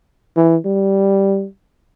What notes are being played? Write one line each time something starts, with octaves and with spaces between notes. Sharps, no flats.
E3
G3